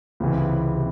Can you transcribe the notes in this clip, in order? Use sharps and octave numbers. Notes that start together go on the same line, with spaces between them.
C#2 C3 E3
C3